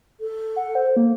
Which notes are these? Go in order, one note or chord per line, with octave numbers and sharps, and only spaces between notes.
A4
F#5
C5
A#3